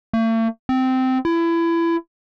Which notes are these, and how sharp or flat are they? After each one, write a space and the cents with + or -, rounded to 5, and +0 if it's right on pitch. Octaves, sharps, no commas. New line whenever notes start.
A3 +45
C4 -15
E4 +25